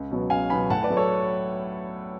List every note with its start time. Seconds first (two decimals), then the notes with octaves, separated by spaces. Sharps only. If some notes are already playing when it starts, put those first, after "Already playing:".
Already playing: C#2
0.11 B2 F#3 B3
0.30 C#2 F5 G#5
0.50 B2 F#3 B3 G#5 B5
0.70 A2 F#5 A5
0.83 B4 D5
0.90 F#3 A3
0.97 A4 C#5